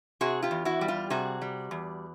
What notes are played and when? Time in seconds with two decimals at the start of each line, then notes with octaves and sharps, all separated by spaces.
0.21 C3 F#4 G#4
0.43 F4 G4
0.51 E2
0.65 E4 F#4
0.81 G3
0.88 F4 G4
1.10 C3 F#4 G#4
1.42 G3
1.71 E2